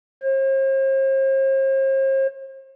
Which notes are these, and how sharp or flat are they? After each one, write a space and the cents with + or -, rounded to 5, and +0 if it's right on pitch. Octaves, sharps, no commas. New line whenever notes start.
C5 +45